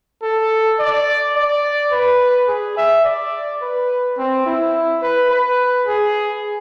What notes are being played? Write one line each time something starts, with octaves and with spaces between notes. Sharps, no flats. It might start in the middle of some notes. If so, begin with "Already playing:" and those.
A4
D5
D5
B4
G#4
E5
D5
B4
C4
E4
B4
B4
G#4